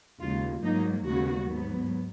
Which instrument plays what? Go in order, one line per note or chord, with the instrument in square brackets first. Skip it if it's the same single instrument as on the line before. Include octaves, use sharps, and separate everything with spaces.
[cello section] D#2 C#3 G#3 F4
G#2 F#3 A#3 D#4
D#2 C#3 G#3 B3 F#4
G#2 F#3 B3